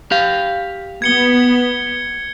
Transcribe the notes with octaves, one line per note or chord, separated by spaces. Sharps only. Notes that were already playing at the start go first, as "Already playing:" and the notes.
G4 F5
B3 G#6 C#7 G7